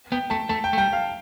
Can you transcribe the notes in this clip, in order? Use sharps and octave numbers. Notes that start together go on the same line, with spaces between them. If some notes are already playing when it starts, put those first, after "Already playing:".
B3 G5
A3 A5
A3 A5
G5
A3
G3 G5
F5